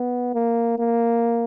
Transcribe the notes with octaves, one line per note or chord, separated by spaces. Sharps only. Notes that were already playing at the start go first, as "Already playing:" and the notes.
Already playing: B3
A#3
A#3